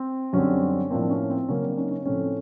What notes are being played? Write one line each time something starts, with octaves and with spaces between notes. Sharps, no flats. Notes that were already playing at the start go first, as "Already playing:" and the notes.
Already playing: C4
F#2 D3 G3 C4 C#4
A2 F3 A#3 C4 D4
C#4
C4
C#3 F#3 A#3 C#4
C4 D4
C#4 D#4
C#4
A2 F3 A3 C4 C#4